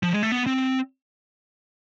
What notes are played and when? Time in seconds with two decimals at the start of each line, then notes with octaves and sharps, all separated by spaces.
0.03 F3
0.13 G#3
0.23 A3
0.32 B3
0.46 C4